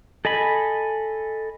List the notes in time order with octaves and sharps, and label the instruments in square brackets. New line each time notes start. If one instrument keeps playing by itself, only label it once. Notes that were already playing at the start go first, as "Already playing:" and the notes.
[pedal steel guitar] A4 D#5 G#5 B5